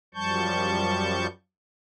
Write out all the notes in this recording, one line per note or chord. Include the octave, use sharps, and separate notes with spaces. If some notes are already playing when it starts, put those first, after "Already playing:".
F#2 F3 G3 A5 C#6 G6